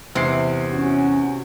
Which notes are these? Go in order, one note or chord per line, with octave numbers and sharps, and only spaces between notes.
E2 C3 C7
C#4 F#4